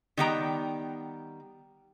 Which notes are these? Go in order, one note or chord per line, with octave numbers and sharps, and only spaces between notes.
D#3 G3 B3 F#5 G5 A#5